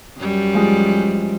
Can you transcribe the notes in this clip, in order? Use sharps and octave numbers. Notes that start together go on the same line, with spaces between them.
F#2 G3
F3 G#3 F4